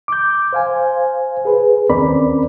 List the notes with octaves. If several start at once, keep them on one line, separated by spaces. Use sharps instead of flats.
D6 G6
C5 F5 G#5
G#4 B4
D#2 C4 C#4 A#4 D5 B5